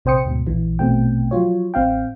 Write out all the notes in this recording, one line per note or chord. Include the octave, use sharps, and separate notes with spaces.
A#1 C3 C5 G5 D#6 C#7
D2 G#2 B2
A#1 E3
A#1 B2 A3 C4 G5
F3 F#3 F4 C#5
A1 C4 F5 G5